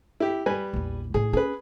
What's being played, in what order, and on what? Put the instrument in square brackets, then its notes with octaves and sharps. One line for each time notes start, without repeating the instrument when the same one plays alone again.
[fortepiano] E4 G4
G3 B4 G#5
[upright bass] A#1 E2
[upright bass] A2 D#4 [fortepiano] G#4
[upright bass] C#4 [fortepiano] G#4 B4